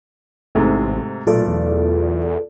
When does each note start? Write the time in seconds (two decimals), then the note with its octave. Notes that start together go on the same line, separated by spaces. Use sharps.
0.55 A1 G#2 C3 A3
1.27 B1 A#2 A3 F4 A4 D5
1.48 E2